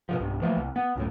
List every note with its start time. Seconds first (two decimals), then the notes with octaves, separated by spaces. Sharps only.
0.09 B2 D3 F3
0.20 B1 G2
0.42 E3 F3 A3 A#3
0.57 C2
0.76 B3
0.96 C#2 F#2 A2